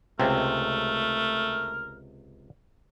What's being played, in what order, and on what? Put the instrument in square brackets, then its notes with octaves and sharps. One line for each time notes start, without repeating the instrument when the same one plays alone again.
[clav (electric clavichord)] C#2 C3 C4 [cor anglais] A3 [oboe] A#4